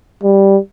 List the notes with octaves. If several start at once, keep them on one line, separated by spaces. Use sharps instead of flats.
G3